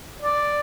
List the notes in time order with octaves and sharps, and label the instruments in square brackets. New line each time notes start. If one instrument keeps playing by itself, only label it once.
[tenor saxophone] D5